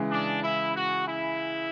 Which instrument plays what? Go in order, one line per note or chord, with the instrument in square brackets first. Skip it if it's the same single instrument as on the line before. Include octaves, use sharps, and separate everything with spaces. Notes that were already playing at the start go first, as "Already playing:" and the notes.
Already playing: [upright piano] C#3 E3 G#3
[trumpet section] D4
E4
F#4
E4